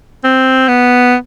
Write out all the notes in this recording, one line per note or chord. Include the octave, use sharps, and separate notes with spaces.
C4
B3